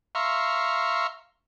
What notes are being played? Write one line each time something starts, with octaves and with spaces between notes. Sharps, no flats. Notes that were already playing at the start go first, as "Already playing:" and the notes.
E5 F5 A#5 C6 C#6